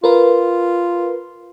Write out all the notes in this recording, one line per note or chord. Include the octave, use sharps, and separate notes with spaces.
F4 A#4 B4